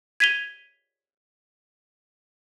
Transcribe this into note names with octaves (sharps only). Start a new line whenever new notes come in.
G#6 B6 D#7 F7 G7